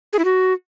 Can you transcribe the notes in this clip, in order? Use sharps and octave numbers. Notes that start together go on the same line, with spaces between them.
G#4
E4
F#4